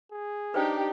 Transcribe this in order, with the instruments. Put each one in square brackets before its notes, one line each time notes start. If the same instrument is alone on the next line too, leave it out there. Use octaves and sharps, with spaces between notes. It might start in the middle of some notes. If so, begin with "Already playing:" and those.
[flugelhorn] G#4
[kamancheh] D4 D#4 [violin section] G4 [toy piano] B4 C5 G5